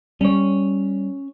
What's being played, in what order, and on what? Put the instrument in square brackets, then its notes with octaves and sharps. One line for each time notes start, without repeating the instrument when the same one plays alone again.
[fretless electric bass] G3 [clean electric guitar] C#4 C#5